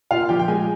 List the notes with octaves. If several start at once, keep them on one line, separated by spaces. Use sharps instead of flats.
A#2 F4 F5
F3 G4 G5
G5
G#3 G#4 G#5